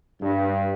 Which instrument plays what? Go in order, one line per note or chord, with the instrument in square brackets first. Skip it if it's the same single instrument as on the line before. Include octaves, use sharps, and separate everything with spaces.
[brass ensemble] G2